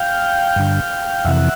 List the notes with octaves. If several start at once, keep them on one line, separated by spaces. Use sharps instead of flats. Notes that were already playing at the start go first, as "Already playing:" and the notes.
Already playing: F5 G5
G2 D3
F2 C3 E3 E5 F#5